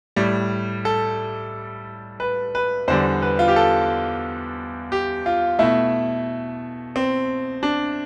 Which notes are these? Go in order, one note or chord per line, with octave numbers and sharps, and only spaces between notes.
A2 G3
A4
B4
B4
E2 D3 G3 C5
B4
F4
G4
A4
G4
F4
B2 A3 E4
C4
D4